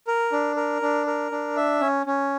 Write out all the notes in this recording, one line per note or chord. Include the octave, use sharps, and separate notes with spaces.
A#4
D4
A#4
D4
A#4
D4
E5
C#4
C#4